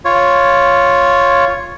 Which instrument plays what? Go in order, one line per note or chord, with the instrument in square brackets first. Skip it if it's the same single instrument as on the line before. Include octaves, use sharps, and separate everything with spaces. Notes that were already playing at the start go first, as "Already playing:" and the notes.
[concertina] F4 C#5